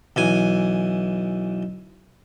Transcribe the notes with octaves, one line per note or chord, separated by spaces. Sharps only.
B1 E3 G#5